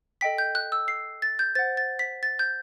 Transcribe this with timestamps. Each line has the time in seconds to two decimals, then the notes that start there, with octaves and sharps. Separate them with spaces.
0.21 A4 D#5 G5 B6
0.38 G6
0.55 F#6
0.72 E6
0.88 C7
1.22 A6
1.39 G6
1.55 C5 F#5 A6
1.77 A6
1.99 B6
2.23 A6
2.39 G6